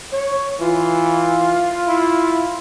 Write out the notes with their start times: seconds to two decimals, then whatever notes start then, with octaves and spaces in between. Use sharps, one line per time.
0.12 C#5
0.60 E3 F4
1.88 E4